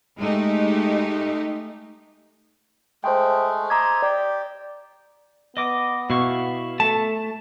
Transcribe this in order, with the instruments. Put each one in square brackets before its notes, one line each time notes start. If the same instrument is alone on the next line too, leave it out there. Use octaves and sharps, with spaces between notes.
[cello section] G#3 A3 D#4 G4
[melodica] G#3 A3 [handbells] C5 G5
[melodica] C5 D#5 E5 [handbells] A#5 D6 G#6
[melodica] G4 G5 [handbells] D5
[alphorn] B3 [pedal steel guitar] D#5 D6 D#6
[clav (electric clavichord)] B2 [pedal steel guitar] E4 F5 C#6
[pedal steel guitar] A3 [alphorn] A4 [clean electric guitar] A5